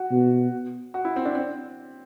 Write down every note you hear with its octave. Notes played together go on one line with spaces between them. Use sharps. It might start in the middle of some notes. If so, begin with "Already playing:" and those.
Already playing: F#4
B2
F#4
E4
C4
D4
C4